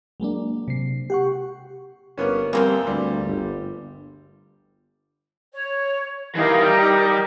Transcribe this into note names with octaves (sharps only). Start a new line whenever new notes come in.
F#3 G#3 A#3 D4
C3 C7
G4 F#5 C#6
G1 A#3 B3 C#4
F2 E3 G3 A#3 C4
D2 G3
G1
C#5
E3 D#4 G4 A#4 F5
G3